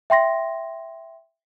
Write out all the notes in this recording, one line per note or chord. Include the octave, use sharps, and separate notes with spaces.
E5 G5 C6 A#6